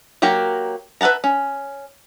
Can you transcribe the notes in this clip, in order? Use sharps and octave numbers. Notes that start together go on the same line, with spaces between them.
F#3 A#3 F#4 G4 A#4
B4 E5 F#5 A5 A#5
C#4